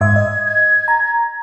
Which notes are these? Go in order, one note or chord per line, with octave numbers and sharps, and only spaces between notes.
G#2 E5 G#6
D#5
G#6
A#5